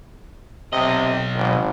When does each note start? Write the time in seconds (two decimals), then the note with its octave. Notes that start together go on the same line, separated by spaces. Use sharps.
0.73 B1 C3 D#5
1.35 G#1